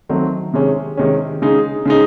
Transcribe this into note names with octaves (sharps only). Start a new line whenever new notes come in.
D#3 F#3 A3 C4
C3 D#3 G#3 C#4
C3 D#3 G#3 C#4
C#3 G#3 D#4
C#3 G#3 D#4